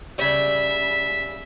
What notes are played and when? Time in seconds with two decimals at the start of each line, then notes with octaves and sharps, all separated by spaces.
0.18 C#3 G3 E5